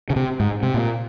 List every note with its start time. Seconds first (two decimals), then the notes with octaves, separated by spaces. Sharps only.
0.10 C#3
0.16 C3
0.40 G#2
0.63 C3
0.74 A#2